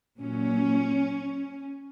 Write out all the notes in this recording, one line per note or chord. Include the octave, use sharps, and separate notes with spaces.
A#2 F#3 C#4